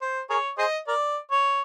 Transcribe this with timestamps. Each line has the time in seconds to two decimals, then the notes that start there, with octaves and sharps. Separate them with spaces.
0.01 C5
0.30 G#4 A#4 C#5
0.58 G#4 C5 D#5
0.88 A#4 D5
1.31 C#5